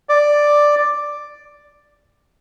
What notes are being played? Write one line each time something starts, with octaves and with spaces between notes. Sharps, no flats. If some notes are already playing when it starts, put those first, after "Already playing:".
D5